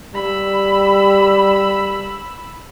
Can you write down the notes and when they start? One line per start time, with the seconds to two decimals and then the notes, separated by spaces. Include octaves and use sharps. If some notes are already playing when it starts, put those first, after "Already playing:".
0.14 G3 B5 E6